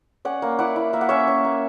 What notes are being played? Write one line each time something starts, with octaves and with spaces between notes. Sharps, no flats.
C#4 D5 F#5
A#3
E4 D5 F#5
E4
A#3 E5
F#5
C#4 C#5 E5
C#4
A#3